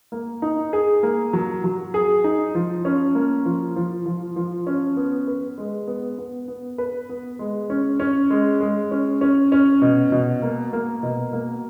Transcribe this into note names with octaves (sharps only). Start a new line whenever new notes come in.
A#3
D#4
G#4
A#3
F#3
F#3
G#4
D#4
F3
C#4
A#3
F3
F3
F3
F3
C#4
B3
B4
G#3
B3
B3
B3
B4
B3
G#3
C#4
C#4
G#3
G#3
C#4
C#4
C#4
B2
B2
A#3
A#3
B2
A#3